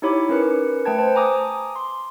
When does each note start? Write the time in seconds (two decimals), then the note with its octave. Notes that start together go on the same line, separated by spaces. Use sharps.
0.02 D#4 E4 G4 C#5 B5 D6
0.29 C#4 A#4 B4 C#7
0.85 A3 B4 G5 A5 G#6
0.98 C5 A5
1.15 G#5 A#5 D6 D#6
1.76 C6